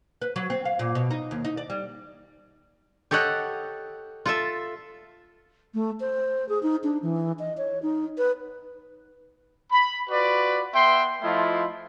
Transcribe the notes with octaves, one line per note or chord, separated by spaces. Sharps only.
B4
F#3
C4
F5
A#2
B2
D#4
D#2
D#4
D5
G3
G4 A4 C#5 D#5 F#5
F4 A4 E5
A3
C5
G#4
D#4
D4
E3
D#5
C#5
D#4
B4
B5
F4 F#4 B4 D5
B3 E5 G5 C6
F3 A3 E4 F4 D#5